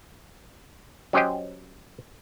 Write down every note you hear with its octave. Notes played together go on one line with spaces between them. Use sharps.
F#3 C#4 G4 C5 D#5 G5